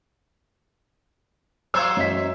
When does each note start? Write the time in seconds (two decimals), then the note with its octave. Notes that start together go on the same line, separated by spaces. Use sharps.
1.74 F#3 C5 C#5 F5 C6 E6
1.97 F#2 D#5 B6